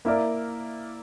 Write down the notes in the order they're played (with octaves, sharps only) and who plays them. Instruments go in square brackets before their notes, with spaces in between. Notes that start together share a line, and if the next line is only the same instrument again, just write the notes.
[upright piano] A#3 E4 A#4 D5